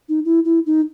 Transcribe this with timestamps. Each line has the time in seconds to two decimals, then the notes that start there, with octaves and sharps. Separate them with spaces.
0.09 D#4
0.25 E4
0.45 E4
0.66 D#4